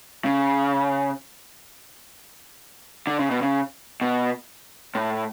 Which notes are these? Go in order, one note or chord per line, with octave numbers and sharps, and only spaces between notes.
C#3
D3
C#3
B2
C#3
B2
A2